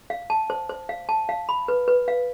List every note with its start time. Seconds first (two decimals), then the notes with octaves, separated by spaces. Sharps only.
0.10 F5
0.30 A5
0.50 C5
0.69 C5
0.89 F5
1.09 A5
1.29 F5
1.49 B5
1.68 B4
1.88 B4
2.08 F5